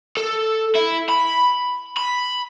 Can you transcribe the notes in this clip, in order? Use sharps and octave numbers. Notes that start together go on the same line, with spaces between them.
A4
E4
B5
B5